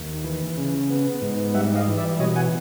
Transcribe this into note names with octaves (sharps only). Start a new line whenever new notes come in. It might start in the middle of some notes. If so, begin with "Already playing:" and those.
Already playing: D#2
E3
C#3
B3
G#2
G3 E5 F#5
D#5 F5
E3
D5 E5
B2 C#5 D#5
F#5 G#5